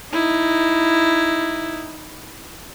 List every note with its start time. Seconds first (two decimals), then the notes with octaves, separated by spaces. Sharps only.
0.13 D#4 E4